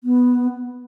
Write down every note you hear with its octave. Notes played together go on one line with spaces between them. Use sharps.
B3